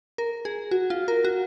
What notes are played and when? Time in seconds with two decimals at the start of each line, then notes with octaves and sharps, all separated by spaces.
0.18 A#4
0.45 G#4
0.71 F#4
0.90 F4
1.08 A#4
1.25 F#4